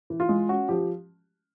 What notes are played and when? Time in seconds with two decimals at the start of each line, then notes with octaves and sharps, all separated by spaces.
0.10 E3
0.20 F4
0.29 G#3
0.49 C#4 F#4
0.69 F3 G4